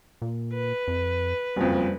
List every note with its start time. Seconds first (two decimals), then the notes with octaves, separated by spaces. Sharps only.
0.22 A#2
0.54 B4
0.88 F2
1.56 F#1 F2 G3